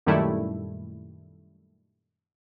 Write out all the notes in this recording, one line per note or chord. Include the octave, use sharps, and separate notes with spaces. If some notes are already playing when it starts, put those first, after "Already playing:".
F#2 A#2 D#3 G3 A3 E4